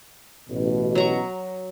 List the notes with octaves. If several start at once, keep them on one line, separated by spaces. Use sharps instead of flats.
A1 B2
F#3 A#5 C#6